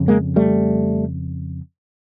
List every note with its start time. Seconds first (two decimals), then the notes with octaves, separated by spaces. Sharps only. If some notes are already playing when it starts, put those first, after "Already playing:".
Already playing: F2 C#3
0.08 G#3 A#3
0.36 G3 A3